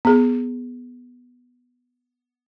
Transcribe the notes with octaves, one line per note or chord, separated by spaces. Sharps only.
B3 G#4